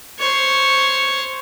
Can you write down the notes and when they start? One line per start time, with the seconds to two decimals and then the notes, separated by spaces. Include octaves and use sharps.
0.19 C5 C#5